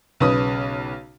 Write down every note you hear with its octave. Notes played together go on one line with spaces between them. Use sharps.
B1 C#3 B4 D#6